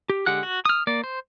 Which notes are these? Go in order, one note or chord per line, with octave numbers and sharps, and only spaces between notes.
G4
D3 G#3 G4 F#5 F#6
F#4
D#6 F6
A#3 D5
C5